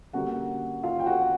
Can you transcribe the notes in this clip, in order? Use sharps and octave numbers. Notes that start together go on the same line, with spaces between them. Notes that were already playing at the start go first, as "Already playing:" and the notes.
D3 G3 A#3 C#4 F#4 F#5
F4 F5
G5
F#4 F#5